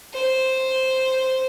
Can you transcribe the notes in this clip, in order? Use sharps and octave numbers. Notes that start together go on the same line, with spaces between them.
C5